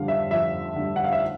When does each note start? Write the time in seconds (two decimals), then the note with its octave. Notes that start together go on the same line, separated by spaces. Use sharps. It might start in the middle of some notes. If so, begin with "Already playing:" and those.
Already playing: F2 D3 G3 F5
0.08 E5
0.31 F2 E5
0.76 D3 G3
0.96 F#5
1.04 F5
1.13 E5